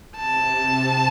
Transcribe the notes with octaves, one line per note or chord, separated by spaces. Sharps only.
C3 A5